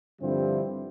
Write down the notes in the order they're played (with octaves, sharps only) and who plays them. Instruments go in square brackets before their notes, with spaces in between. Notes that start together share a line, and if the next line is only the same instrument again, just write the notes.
[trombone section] G2 D3 F3 G3 C4 E4